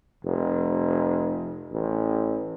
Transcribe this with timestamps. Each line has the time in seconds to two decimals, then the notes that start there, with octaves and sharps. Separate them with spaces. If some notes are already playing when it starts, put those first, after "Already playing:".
0.25 F1
1.72 A1